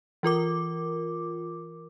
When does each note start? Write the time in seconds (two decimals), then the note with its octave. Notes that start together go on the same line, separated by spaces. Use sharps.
0.23 E3 F4 A#4 D6